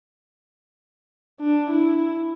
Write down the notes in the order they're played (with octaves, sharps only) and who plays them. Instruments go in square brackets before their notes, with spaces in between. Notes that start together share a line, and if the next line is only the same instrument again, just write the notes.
[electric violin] D4
E4